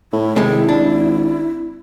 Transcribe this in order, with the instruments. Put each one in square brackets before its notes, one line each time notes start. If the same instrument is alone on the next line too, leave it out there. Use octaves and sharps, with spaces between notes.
[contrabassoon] A2 [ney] E4
[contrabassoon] G#1 [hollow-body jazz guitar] C3 D#3 G#3
[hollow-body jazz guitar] D4